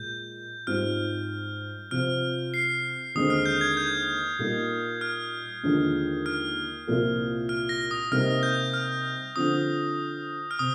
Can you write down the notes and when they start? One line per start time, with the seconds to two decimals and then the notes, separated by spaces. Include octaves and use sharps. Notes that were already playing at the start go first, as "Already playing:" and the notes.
Already playing: A#2 G#3 G6
0.67 G#2 G3 C4 F4 F6
1.91 C3 F3 C4 F4 F6
2.54 C7
3.15 D#2 D3 G#3 C4 D#6
3.30 F6
3.46 G6
3.61 G#6
3.77 G6
4.39 A#2 G3 A#3 D#4
5.01 F6
5.63 D#2 D3 F3 G#3 D4
6.26 F6
6.87 C2 A#2 F3 A#3
7.49 F6
7.69 A#6
7.91 D#6
8.11 C3 G3 A#3 D#4 F6
8.43 G6
8.74 F6
9.35 D3 F3 C4 D#6
10.51 F6
10.59 C3 D#6